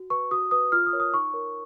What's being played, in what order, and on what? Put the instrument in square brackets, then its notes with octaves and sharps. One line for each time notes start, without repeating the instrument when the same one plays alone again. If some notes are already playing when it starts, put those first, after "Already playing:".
Already playing: [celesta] F#4
B4 C#6
F#4 D#6
B4 D#6
F4 F6
D#6
A#4 C#5
D#6
D#4 C#6
A#4 C#5